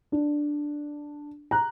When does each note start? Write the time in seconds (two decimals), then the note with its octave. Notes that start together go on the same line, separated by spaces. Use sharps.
0.12 D4
1.51 A#5 F#6